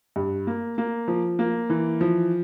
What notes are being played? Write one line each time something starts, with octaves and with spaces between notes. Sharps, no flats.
G2
A#3
A#3
F3
A#3
E3
F3